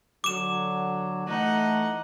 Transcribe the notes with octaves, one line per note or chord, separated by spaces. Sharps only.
D3 F#3 D6 E7
E3 A3 D#4 F#5